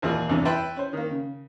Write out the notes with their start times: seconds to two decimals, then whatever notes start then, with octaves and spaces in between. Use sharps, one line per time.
0.02 D#2 A#2 E3 F4 G#4 A#4
0.29 E2 G2 C3 E3
0.45 E4 B4 G5 A5 B5 C6
0.76 C#4 C5
0.93 D#3 A#3
1.10 C#3